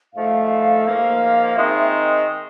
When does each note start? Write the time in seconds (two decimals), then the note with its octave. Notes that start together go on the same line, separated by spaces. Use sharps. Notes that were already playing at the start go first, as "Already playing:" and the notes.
0.14 G#2 F3 A3 F5
0.84 G#2 F3 A#3
1.54 D#3 G#3 C4 D#4 E5